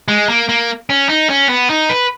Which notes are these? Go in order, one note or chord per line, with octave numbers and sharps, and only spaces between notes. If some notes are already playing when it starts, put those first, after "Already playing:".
G#3
A#3
A#3
C#4
D#4
C#4
B3
D#4
B4